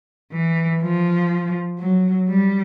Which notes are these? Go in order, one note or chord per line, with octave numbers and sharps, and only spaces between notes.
E3
F3
F#3
G3